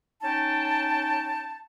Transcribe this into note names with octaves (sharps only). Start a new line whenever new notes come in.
C#4 D#4 G5 A5